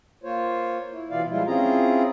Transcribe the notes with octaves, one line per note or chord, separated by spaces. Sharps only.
A#3 F4 C5 C#5
E4
B2 E3 E4 F4 D5 F5
F3 G3 G#3 E4 F4
C4 C#4 E4 F4 G#4 A#5